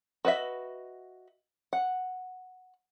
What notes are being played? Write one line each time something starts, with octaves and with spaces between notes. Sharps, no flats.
F#4 B4 D#5 E5
F#5